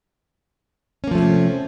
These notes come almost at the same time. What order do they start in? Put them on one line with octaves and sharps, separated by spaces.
C#4 A#3 F3 A3 C3